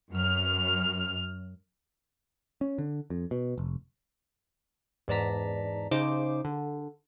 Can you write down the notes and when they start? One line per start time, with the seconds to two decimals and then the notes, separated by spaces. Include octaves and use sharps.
0.11 F#2 F6
2.61 C#4
2.78 D3
3.10 F2
3.31 B2
3.58 F1
5.08 E2 G#2 D5 A5 A#5 B6
5.91 C#3 D#4 C5 D6
6.45 D3